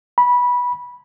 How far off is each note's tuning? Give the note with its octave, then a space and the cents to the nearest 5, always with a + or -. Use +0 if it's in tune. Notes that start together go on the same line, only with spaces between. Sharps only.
B5 -15